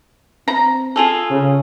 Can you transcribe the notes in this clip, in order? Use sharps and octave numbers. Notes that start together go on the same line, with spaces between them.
C4 A#5
F4 G#4 A4
C#3